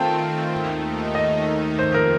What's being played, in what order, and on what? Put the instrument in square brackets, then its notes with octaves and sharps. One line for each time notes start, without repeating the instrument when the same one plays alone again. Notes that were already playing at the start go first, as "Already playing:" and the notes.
Already playing: [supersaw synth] D#3 A3 C4 F4 [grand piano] G5 A5
[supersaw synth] D#2 D#3 A3 D#4
[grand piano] D#5
[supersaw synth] F2 C3 F3 A#3 [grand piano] C5
[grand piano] A#4